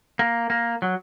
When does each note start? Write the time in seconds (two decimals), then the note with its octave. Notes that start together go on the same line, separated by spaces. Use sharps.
0.19 A#3
0.50 A#3
0.82 F#3